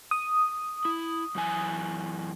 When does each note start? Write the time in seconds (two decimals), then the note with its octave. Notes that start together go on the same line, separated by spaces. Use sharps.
0.11 D#6
0.85 E4
1.35 F#2 E3 G#5